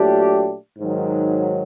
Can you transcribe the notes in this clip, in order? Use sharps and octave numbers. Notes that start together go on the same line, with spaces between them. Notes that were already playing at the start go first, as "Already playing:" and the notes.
Already playing: A#2 F#3 A3 D4 G4
G#2 D#3 F#3